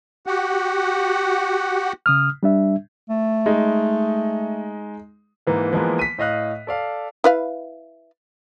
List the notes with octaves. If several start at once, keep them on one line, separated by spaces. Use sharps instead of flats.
F#4 G4 F#5
C#3 D#6 F6
G3 D4 E5
A3
G#3 D#4
G#2 E3 A#3
E3 F3 G#3 A#3 B3
B6 D#7
A2 D#5 F5 F#6
A4 D5 F5
E4 B4 F5